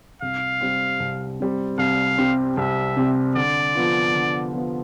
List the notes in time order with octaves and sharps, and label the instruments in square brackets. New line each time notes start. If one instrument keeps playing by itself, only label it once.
[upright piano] C2 [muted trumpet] F5
[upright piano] C3 G3 C4
C2
C3 G3 C4
[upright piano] C2 [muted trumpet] F5
[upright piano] C3 G3 C4
[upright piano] C2 [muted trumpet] E5
[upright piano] C3 G3 C4
[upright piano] D3 [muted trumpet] D5
[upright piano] F3 B3 F4
D3
F3 B3 F4